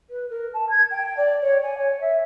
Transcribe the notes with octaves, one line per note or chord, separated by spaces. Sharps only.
B4
A#4
A5
G#6
G5
D5
C#5
G#5
C#5
E5